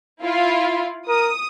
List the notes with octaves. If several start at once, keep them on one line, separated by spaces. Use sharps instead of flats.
E4 F4 F5
A#4 D#6